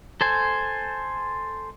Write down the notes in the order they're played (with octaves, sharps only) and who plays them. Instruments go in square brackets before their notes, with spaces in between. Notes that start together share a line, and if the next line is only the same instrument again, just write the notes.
[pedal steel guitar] A4 C5 G#5